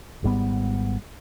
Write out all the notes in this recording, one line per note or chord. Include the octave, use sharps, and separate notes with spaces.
G#1 G#2 G3 B3